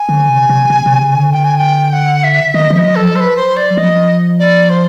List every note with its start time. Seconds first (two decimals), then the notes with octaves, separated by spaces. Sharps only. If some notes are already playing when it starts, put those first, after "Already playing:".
Already playing: G#5
0.09 D3
0.29 C3
0.50 C3
0.70 C3
0.86 C3
1.00 C#3
1.16 D3
1.32 G5
1.44 G#5
1.58 G5
1.93 F#5
2.24 E5
2.54 D#3 D#5
2.70 F3 E5
2.79 D#5
2.86 F#3
2.95 A4
3.01 F3
3.15 F#3 C5
3.20 B4
3.36 C5
3.56 D5
3.77 F3 D#5
4.39 D5
4.69 C5